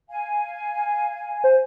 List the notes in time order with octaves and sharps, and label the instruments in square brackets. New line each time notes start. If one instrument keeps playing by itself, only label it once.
[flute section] F5 G#5
[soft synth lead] C5